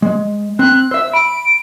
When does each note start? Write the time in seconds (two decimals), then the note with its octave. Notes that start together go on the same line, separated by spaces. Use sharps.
0.02 G#3
0.59 C4 F#6
0.91 C5 E5 E6
1.14 B5 D7